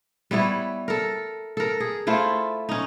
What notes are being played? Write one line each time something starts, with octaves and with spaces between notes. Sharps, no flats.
G3 B3 E4 C#5
A4 A#4
A4 A#4
G#4
A3 E4 F4 C5
C#4 D#4